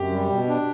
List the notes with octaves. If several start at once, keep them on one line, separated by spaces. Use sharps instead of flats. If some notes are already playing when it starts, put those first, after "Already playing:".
Already playing: F#2 G4
G3
B2
D4